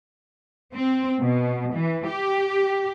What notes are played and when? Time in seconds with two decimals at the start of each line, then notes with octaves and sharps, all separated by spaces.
0.72 C4
1.20 B2
1.73 E3
2.07 G4